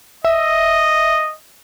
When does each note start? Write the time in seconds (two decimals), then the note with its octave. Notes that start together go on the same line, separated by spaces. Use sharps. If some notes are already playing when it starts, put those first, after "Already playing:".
0.25 D#5 E5